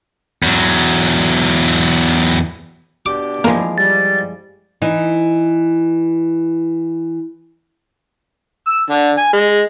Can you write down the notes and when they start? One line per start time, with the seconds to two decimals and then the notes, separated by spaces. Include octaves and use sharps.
0.43 E2 F#3
3.06 B2 D4 G4 D6
3.44 F3 G#3 A#3 E4
3.78 G3 A6
4.82 E3 D#4
8.67 E6
8.90 D3
9.18 G#5
9.33 G#3